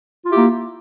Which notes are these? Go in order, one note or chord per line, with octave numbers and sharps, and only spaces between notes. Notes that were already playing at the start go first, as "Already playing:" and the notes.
A#3 E4 F4 G4